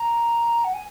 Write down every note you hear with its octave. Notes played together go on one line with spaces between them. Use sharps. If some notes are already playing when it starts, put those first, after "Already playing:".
Already playing: A#5
F#5
G#5